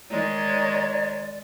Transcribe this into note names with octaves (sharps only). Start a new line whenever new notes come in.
D#3 G#3 C#5 D5 A#5